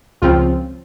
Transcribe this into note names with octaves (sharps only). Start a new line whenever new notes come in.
C#2 C#3 F3 C4 F4